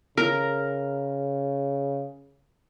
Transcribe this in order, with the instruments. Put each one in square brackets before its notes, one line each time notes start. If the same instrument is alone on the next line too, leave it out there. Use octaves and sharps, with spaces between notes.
[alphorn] C#3 [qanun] A#4